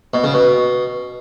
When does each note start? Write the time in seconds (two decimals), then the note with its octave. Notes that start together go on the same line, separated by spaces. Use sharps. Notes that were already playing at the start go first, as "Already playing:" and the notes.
0.14 B2
0.24 C#3
0.34 B2